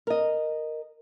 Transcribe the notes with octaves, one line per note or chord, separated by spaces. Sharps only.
A#4 D#5